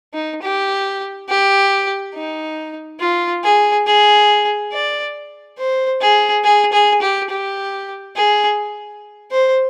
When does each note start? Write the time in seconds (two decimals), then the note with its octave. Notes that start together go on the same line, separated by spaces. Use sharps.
0.14 D#4
0.42 G4
1.29 G4
2.14 D#4
3.00 F4
3.44 G#4
3.87 G#4
4.72 D5
5.58 C5
6.02 G#4
6.44 G#4
6.73 G#4
7.02 G4
7.30 G4
8.16 G#4
9.31 C5